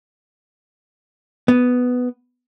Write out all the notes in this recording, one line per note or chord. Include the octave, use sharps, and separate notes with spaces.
B3